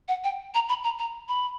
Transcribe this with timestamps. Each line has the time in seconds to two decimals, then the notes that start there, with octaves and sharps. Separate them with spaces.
0.08 F#5
0.24 G5
0.54 A#5
0.69 B5
0.84 A#5
0.99 A#5
1.28 B5